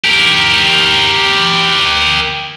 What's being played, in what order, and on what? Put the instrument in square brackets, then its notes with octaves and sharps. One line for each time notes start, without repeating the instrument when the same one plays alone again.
[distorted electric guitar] G4 A#4